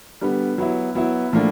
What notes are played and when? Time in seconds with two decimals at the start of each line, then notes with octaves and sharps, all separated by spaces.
0.21 D3 G3 B3
0.58 F#3 B3 E4
0.95 F#3 B3 E4
1.33 A2 F3 A#3 D4